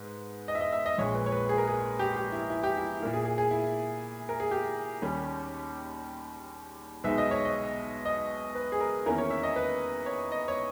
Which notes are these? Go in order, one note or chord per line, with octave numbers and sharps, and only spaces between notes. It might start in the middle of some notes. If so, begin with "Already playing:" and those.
Already playing: G#2 B3
D#5
E5
D#5
E5
D#5
A#1 A#2 G#3 C#5
B4
C#5
B4
G#4
A#4
G#4
G4
G4
E4
E4
G4
E4
A#2 A#3 E4
G#4
G#4
G#4
E4
A#4
G#4
G4
D#2 D#3 G3 C#4
B1 B2 G#3 B3 D#4 E5
D#5
C#5
D#5
D#5
B4
G#4
A#4
E2 D#3 A#3 C#4 E4 A#4
C#5
E5
D#5
B4
C#5
D#5
C#5